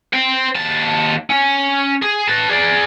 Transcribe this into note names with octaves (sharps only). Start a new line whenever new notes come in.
C5 G5
D#2 A5
C#4
G#4
B4 A5
G#4 D5